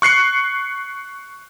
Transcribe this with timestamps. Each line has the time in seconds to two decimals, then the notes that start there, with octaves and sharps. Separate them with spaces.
0.02 C#6 F#6 C7 C#7